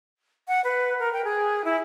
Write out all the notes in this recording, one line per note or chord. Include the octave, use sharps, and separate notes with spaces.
F#5
B4
A#4
G5
G#4
E4